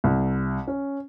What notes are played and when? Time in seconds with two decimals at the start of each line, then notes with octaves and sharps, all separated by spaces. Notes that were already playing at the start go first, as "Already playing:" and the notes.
0.04 C2
0.67 C#4